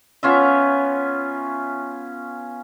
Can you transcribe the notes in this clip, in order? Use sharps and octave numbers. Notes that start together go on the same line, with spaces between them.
B3 C#4 F4 E5